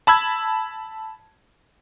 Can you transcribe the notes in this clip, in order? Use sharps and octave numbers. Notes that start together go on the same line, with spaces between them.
A5 B5 E6 G#6